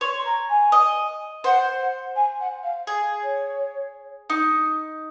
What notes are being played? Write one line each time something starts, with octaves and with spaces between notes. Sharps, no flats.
C#5 C6
C6
A#5
G#5
D#5
C5 F#5
F#5
G#5
F#5
F5
G#4
C#5
D#4